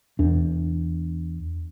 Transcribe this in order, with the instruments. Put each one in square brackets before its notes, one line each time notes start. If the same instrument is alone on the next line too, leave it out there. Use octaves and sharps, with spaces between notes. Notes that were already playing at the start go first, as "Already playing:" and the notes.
[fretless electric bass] E2 D4